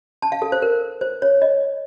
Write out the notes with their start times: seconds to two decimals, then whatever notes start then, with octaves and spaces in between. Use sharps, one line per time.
0.22 A5
0.32 F5
0.42 A4
0.52 C5
0.62 A#4
1.01 C5
1.22 C#5
1.42 D#5